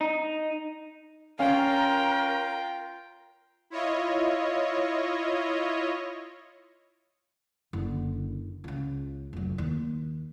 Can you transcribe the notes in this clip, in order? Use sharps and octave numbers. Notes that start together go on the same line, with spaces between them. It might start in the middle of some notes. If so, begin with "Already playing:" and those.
D#4
C#4 F4 A#4 F5 G5
E4 F4 C#5 D#5
F#1 D3
C#2 C#3
F1 F#3
D#2